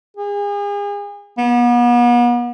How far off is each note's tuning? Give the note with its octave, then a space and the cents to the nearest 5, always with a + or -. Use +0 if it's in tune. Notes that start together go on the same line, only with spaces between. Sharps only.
G#4 -35
B3 -40